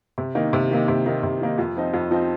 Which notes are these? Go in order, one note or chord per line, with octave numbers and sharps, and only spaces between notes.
C3
D#3 A#3 D#4
C3
D#3 A#3 D#4
C3
D#3 A#3 D#4
C3
D#3 A#3 D#4
F2
F3 C4 D#4
F2
F3 C4 D#4